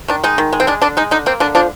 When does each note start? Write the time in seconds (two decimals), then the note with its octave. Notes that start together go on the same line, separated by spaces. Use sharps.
0.08 D#3 D4
0.24 G#3 D#4
0.38 D#3
0.53 G#3
0.60 C4
0.67 G#3 D4
0.82 D3 D4
0.97 G#3 D#4
1.11 D3 D#4
1.26 A#3 C4
1.40 D3 D4
1.55 F3 D4